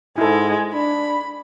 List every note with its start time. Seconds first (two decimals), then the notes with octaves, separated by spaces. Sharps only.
0.18 G#2 G#3 E4 A4
0.74 D4 B5